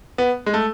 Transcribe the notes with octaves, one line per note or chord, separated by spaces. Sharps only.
B3
G#3
A3